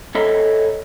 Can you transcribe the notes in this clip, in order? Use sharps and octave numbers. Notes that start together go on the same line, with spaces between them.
A4 C#5 D#5 E5 A#5 B5